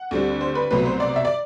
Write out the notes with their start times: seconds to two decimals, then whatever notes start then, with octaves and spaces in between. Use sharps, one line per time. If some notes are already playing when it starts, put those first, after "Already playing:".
Already playing: F#5
0.11 D2 D3 G3 C4
0.41 C5
0.55 B4
0.71 C2 B2 F#3 A3 C4 B4
0.86 C5
1.00 D5
1.16 E5
1.25 D5